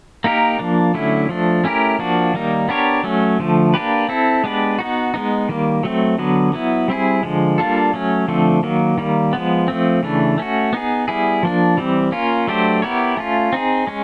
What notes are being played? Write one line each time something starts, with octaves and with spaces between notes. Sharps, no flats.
A#3 D#4 G4 A#4
F3 A#3 D4
D3 F#3 A3 C#4 E4
F3 A3 D4
A3 C#4 E4 G4 A#4
F3 A#3 D4 F#4
D#3 G3 A#3 D#4
B3 D4 G4 A#4 C#5
F#3 A3 C#4
D3 F3 A3
A#3 D4 G4 B4
C4 E4 A4
G#3 B3 D4 G4 B4
B3 D#4 F#4
G#3 B3 D#4
D#3 G3 A#3
F#3 A3 C4
D3 F#3 B3
F#3 B3 E4
G3 C4 E4 G#4
D3 F3 G#3
G3 A#3 D4 F4 A4
F#3 A3 C#4
D3 F3 A3 C4
D#3 F#3 A#3
D#3 G3 A#3
F3 G#3 B3
F3 A3 C4
C#3 E3 A3 D4
A3 C#4 F#4
B3 D#4 G#4
G3 B3 E4 G#4
F3 A#3 D4
E3 G3 C4
A#3 C#4 F4
F#3 A3 D4 G4 C5
B3 E4 G4 A#4 C#5
A3 C#4 F4
C4 D#4 G#4
G#3 C#4